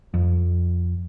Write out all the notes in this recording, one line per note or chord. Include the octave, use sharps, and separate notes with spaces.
F2